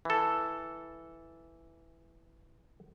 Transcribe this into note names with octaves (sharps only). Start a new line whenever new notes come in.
E3 A4